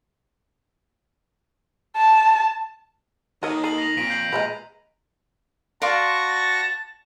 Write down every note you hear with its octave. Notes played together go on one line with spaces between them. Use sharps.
A5
D#3 A#3 A4 A#4 C#5 D#5
A4 A#5 C7 D#7 F#7
A#6 F7
F2 A#2 B6 D7 D#7
G6 C7 F#7
A#2 G#3 A#3 B4 A#5
F#4 D5 F5 A5 C6 C#6 A#6